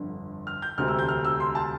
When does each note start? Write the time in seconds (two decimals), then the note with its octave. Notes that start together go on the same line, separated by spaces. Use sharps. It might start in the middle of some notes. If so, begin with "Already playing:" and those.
Already playing: G1 F2 D3
0.47 F6
0.62 G6
0.78 E1 D2 C3 F6
0.88 E6
0.99 G6
1.08 F6
1.25 E6
1.40 C6
1.55 A5